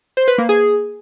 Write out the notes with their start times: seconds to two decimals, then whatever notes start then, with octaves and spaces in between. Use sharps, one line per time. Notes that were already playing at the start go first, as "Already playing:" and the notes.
0.17 C5
0.28 B4
0.38 A#3
0.49 G#4